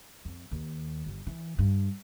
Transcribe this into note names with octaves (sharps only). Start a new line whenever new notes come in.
F2
D#2
G1
E3
G2